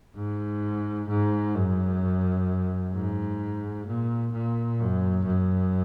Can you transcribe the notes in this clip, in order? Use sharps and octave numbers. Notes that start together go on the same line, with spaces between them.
G#2
G#2
F#2
G#2
A#2
A#2
F#2
F#2